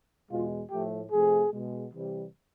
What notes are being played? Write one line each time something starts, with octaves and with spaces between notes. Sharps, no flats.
E2 B2 G#3 F4
A2 F3 A3 G4
C3 F3 A3 G#4
B2 G#3
C3 E3 G3